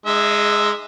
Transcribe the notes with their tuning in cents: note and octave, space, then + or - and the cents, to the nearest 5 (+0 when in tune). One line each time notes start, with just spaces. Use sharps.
G#3 +0 D#4 -40 E5 +0